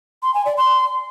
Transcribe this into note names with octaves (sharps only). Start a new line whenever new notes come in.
C6
G#5
D5
C6